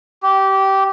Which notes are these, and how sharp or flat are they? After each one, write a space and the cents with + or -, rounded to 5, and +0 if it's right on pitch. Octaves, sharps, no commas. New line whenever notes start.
G4 -20